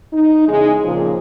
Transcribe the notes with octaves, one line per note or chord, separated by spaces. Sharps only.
D#4
E2 C#3 G#3
A#2 C#3 F3